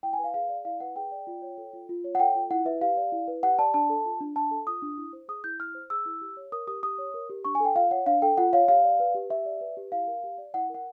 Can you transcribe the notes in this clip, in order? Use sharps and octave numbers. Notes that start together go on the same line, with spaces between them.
E4 G5
G#5
B4
F5
G#4 F5
D5
E4 F5
B4 F#5
G#4 G5
D5
F4
C#5
A4
F4
F4
C#5
F#5
A4 G5
F4
E4 F#5
B4 E5
G4 F5
D5
E4
B4
G4 F#5
D5 A5
D4 A5
A4
F4
D4
D4 A5
A4
F4 D#6
D4
E4
C5
G#4 D#6
E4 G6
E4 F6
C5
G#4 E6
E4
G4
C#5
A#4 D#6
G4 D#6
G4 D#6
C#5
A#4
G4
D4 C#6
G#5
A4 G5
F4 F5
C#5 F#5
D4 F5
A4 G5
F4 F#5
C#5 F5
G4 F5
D5
B4
G4
G4 E5
D5
B4
G4
E4 F5
A#4
G4
D5
E4 F#5
A#4
F#5